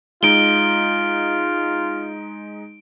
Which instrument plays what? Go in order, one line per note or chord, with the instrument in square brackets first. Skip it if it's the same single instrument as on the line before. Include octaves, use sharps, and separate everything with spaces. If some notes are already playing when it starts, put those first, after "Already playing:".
[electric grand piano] G#3 D#4 [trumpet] F4 [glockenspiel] D7 G7